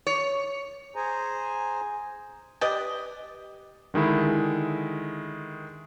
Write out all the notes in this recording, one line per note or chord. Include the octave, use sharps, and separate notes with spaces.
C#5
G#4 C5 G#5 A#5
G4 B4 D5 D#5
D3 D#3 G#3 E4